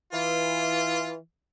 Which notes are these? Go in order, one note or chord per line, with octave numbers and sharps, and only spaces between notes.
E3 F4